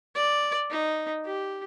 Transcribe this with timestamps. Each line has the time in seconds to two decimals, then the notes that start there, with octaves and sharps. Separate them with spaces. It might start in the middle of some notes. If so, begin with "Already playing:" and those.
0.16 D5
0.70 D#4
1.25 G4